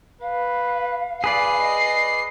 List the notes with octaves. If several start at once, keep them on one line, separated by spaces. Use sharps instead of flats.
B4 F5
G#4 B4 D5 C7
D#5